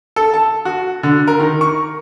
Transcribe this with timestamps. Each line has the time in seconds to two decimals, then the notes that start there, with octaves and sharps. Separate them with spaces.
0.16 A4
0.34 A5
0.65 F#4
1.03 D3
1.28 A#4
1.39 D#3
1.61 C#6